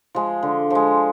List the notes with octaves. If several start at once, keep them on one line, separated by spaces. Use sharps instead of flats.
F3 G#3
D3
F3 G#3